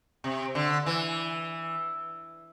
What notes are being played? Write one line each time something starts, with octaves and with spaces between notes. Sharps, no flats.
C3
D3
E3